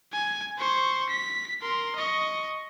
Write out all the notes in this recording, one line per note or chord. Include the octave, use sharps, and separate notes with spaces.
G#5
C5 C#6
B6
A#4 C6
D#5 C#6